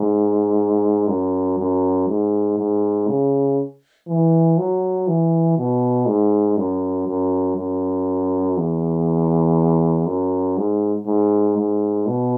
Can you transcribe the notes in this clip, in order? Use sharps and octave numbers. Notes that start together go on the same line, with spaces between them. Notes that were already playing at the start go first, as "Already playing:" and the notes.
Already playing: G#2
F#2
F#2
G#2
G#2
C#3
E3
F#3
E3
B2
G#2
F#2
F#2
F#2
E2
F#2
G#2
G#2
G#2
B2